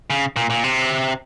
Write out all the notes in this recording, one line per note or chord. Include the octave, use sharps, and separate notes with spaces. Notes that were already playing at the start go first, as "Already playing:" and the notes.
C#3
A#2
A#2
C3